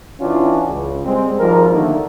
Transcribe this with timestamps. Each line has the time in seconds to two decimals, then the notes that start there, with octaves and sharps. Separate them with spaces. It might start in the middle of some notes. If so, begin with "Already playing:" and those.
0.21 E3 C#4 D4 F4 F#4
0.69 C#2
1.05 G3 G#3 C4
1.39 G#1 F3 G3 A#4
1.73 D3 D#3 A3 A#3 D#4